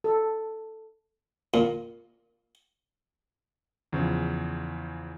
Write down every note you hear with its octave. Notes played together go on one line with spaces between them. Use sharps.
A4
A#2
E2 C#3 F3